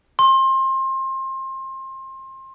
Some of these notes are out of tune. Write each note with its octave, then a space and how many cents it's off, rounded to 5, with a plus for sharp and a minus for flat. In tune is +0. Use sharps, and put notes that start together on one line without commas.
C6 +25